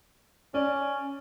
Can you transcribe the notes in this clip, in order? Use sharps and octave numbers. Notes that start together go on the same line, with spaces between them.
C#4 D5